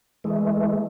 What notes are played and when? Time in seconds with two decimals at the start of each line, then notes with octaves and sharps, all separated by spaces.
0.24 E3 G#3 A3